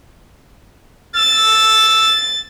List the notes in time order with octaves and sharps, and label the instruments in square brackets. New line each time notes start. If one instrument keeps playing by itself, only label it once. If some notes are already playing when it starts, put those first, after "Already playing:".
[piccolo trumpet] E6 [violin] A6